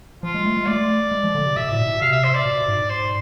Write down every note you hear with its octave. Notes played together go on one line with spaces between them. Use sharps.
F3 F4
G#3
A3
G#3
A3 D5
G#3
F3
D3
C3
B2 E5
A2
B2
C3 F5
E5
C5
D5
B2
G#2
C5